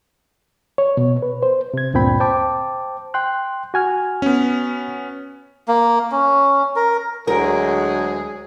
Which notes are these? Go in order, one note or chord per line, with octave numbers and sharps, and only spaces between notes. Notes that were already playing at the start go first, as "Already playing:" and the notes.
C#5
B2
B4
C5
C3 G#6
D2 G2 A#2 C4 G5 B5
C5 G5 A5 D6
G5 C6 F#6
F#4 G#5 F6
B3 C#4
A#3
C#4
A#4
D2 F#3 G#3 G#4 A#4